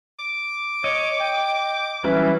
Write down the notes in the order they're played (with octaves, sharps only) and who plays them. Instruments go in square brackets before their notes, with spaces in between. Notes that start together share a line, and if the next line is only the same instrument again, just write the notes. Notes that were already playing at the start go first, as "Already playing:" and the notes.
[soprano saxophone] D6
[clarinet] C#5 [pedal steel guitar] D#5
[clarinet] G5
[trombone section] E3 [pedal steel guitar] F#3 G3 C#4 [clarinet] B4